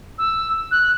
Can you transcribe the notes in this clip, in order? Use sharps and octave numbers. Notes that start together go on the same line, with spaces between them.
E6
F#6